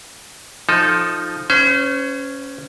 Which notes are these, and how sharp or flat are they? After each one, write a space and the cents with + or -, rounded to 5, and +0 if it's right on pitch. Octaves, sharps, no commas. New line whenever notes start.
F3 +0 D#4 +0 A4 +0
C#4 +0 C5 -40 E5 +0